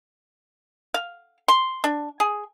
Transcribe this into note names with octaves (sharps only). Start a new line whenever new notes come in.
F5
C6
D4
G#4